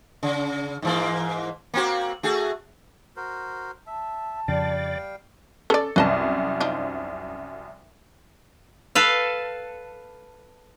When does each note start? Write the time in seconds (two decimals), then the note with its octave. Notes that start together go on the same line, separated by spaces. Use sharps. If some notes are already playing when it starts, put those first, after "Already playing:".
0.23 C#3
0.82 G#2 E3 A#3
1.74 A#3 C4 F#4
2.23 A3 F#4 G#4
3.16 F#4 A#4 C5
3.87 E5 A5
4.48 F2 C#3 G3 D5 F5 G5
5.70 C#4 A4 D5
5.96 C2 F#2 B4 D#5 A5
6.60 F3 D4 D#4
8.95 A4 B4 F5